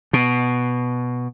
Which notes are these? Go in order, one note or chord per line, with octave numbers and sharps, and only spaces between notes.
B2